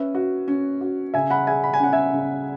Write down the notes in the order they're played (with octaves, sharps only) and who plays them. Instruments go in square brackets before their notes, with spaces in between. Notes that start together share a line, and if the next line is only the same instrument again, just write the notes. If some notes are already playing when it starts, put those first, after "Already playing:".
Already playing: [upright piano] C#4 [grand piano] B4 E5
[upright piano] F#4
C#4
F#4
[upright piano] C#3 [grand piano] E5 G#5
[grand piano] F#5 B5
[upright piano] G#4 [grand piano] E5 G#5
[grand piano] B5
G#5
[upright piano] C#4 [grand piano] F#5
[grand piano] E5 G#5
[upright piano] C#3